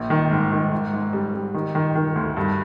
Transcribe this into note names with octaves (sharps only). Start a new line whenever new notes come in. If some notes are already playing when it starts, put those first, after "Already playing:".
Already playing: A#1
D#3
G#2
D#3
G#2
G#2
G3
G3
D#3
D#3
D#3
D2
G2